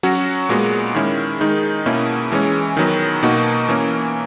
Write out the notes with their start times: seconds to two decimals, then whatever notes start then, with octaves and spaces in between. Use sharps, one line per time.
0.03 F#3 C#4 F#4
0.49 A#2 G#3 B3 F#4
0.95 D#3 G#3 C#4 E4
1.41 D#3 G#3 D#4
1.86 B2 A#3 C#4 E4
2.32 E3 G#3 C#4
2.77 D#3 F#3 B3
3.23 B2 A#3 D#4 F#4
3.68 E3 A#3 C#4